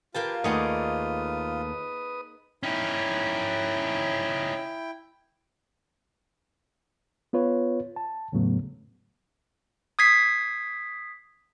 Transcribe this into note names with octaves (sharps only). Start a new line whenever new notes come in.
A#3 F4 G4 B4 G5 A5
D#2 A3 D#4 G#4 B4 D5 F#5 D#6
C#4 D#4 E4 G5
B3 F4 B4 C#5
A5
E2 A2 C#3 F#3 A3 B3
D#6 G#6 B6 C7